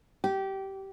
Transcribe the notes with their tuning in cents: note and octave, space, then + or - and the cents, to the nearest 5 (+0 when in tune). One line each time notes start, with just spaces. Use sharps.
G4 -20